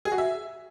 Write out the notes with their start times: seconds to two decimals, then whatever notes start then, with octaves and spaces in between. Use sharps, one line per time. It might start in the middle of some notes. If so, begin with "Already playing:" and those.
0.05 G#4
0.12 F#4
0.18 E5